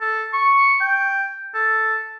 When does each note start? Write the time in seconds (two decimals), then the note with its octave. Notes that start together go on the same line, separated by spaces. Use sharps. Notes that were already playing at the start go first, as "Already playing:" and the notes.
0.01 A4
0.33 C#6
0.81 G5
1.54 A4